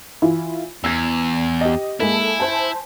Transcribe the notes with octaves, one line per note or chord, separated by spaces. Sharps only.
E3 E4 F4
E2 E6 G#6
G4 D#5
G#3 A#3 E4 A4
C5 G#5 A5